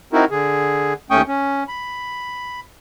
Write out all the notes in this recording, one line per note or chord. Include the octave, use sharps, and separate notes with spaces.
C4 D#4 E4 F#4 A#4
D3 G#4
D#2 A3 C#4 G5 C#6 D#6
C#4
B5